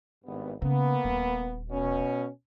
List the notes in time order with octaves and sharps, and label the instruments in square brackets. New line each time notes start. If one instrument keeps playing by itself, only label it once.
[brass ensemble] G#1 G2 B3
[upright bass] C#3 [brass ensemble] A#3 B3
[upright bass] D#1
[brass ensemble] B2 C#4